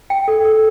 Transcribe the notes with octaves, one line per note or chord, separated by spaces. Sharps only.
G5
A4
A4